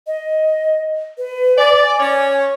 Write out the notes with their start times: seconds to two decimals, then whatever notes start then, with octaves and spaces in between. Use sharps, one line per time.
0.07 D#5
1.18 B4
1.58 D5 G#5
1.99 C#4 C#5